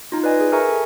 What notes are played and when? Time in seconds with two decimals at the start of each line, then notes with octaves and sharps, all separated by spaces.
0.12 D#4 F4
0.24 B4 D5 D#5 G#5
0.40 G#4
0.52 G#4 A#4 E5 G#5 A#5 C#6
0.69 A4